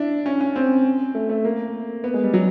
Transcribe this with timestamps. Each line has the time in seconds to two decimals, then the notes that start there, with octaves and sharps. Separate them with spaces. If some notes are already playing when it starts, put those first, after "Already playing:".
Already playing: D4 E4
0.26 C#4
0.41 C#4
0.56 C4
1.15 A3
1.29 A3
1.45 A#3
2.04 B3
2.14 G#3
2.23 G3
2.33 F#3